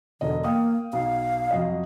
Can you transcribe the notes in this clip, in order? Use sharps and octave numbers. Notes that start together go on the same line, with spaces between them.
E1 D3 D#5
A#3 F5 G5 D#6
B1 F5
F2 F#3 D#5